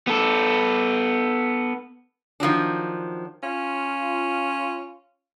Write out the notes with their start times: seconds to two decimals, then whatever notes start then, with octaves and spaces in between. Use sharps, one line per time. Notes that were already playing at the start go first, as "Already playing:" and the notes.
0.07 B3 A4
2.40 D#3 F3 F#3 D4
3.43 C#4 F4